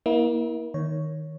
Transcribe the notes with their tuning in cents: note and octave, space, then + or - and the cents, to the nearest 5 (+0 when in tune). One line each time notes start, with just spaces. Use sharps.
A#3 +30 E4 -30
D#3 +0 C#5 +0